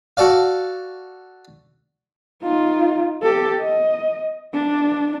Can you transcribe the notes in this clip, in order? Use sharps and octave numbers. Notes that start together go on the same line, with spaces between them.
F#4 A4 D5 F5
D#4 F4
G4 A4
D#5
D4